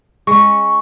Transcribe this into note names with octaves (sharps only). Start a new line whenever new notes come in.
G#3 C#4 C#6